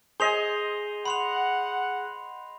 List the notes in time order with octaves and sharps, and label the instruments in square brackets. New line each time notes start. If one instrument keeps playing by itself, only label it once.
[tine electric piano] G#4 [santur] C5 D#5 G#5 [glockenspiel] C7 F7 G7
[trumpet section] F#5 [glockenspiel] B5 C6 F7